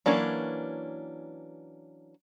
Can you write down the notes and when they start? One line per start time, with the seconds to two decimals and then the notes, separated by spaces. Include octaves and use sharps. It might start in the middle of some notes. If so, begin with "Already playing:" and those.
0.06 E3 F#3 A#3 C#4 D4